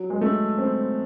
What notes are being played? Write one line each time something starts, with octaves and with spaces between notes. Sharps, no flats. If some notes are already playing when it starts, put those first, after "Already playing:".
Already playing: F#3
G#3
A3
C4